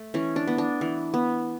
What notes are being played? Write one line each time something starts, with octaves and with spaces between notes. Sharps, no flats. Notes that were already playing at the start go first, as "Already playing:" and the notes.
Already playing: A3
E3 C#4
D4
B3
D4
E3
B3